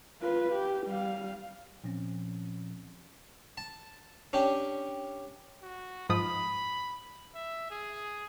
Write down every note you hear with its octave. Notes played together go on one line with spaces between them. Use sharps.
F4 B4
G4
G3 F5
A#2 F3 C4 C#4
A5
C#4 D4 G4
F#4
G#2 F3 B5 D#6
E5
G#4